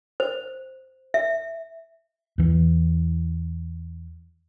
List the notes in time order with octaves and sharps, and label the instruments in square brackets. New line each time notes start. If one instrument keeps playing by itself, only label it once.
[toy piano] C5
E5
[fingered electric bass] E2 E3